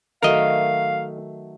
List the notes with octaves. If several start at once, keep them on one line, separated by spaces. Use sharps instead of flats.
D#3 F#3 A3 A#4 D#5 F5